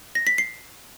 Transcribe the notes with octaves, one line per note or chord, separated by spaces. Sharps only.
A#6
B6
C7